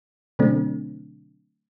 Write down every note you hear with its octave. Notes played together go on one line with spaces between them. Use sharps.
B2 D3 F#3 A3 C4 D4